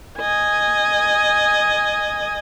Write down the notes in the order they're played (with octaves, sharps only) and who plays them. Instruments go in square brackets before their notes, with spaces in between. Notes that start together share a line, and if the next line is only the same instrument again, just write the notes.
[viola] D#5 G#5